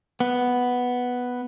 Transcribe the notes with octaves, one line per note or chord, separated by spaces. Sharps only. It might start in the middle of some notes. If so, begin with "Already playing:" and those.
B3